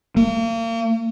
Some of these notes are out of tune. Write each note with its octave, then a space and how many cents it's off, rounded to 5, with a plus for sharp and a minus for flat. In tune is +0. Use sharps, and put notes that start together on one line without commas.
A#3 -35